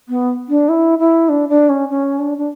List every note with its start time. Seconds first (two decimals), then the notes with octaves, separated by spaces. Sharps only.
0.09 B3
0.49 D4
0.69 E4
0.99 E4
1.29 D4
1.49 D4
1.69 C#4
1.89 C#4
2.19 D4
2.38 D4